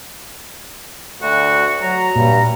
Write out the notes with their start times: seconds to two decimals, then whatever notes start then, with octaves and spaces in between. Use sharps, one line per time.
1.22 D2 F#4
1.82 F#3 A#5
2.16 G2 A#2